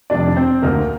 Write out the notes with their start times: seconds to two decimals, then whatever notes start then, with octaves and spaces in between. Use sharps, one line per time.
0.10 F1 F2 C3 D#3 D4 D5
0.36 C4 C5
0.62 D2 D3 A#3 A#4